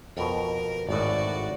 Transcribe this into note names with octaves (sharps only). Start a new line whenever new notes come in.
F2 B2 A#4
G#1 A2 F#4 D5